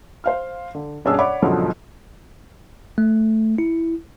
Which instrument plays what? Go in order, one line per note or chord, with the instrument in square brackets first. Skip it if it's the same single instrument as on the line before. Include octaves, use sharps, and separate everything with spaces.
[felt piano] C5 F5 F6
D3
G1 B2 C#4 D4 G#4 E6
C#5 D5 F#5 B5 D6
C#2 G#2 B2 D3 F3 F#3
[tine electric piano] A3
E4